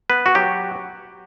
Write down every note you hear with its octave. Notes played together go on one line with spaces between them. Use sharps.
B3 B4
F#4
F#3 G4